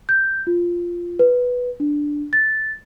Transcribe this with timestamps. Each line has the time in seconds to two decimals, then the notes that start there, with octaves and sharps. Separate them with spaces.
0.09 G6
0.47 F4
1.19 B4
1.80 D4
2.33 A6